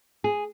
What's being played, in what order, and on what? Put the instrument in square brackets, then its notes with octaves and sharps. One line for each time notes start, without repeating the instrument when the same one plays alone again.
[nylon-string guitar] G#4